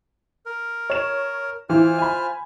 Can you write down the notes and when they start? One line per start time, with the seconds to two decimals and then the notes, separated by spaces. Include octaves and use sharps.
0.46 A#4
0.90 C#5 E7
1.69 E3 F4 C5 F6
1.99 G#5 B5